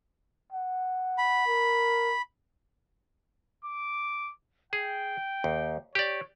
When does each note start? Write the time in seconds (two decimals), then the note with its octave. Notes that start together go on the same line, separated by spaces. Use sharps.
0.52 F#5
1.18 B5
1.47 A#4
3.65 D6
4.73 G#4 G5
5.44 D#2
5.95 G4 C#5 D5